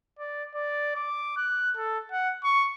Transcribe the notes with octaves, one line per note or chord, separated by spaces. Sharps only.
D5
D5
D6
F#6
A4
F#5
C#6